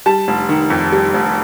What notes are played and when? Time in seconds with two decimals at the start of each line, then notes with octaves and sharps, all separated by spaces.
0.06 G3 A5
0.28 F1
0.49 D#3
0.70 F2
0.92 G3
1.14 F1